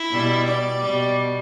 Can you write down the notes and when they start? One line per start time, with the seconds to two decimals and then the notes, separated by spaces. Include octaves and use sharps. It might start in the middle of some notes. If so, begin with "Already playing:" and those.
Already playing: E4
0.10 B2 G3
0.45 D5
0.80 B2 G3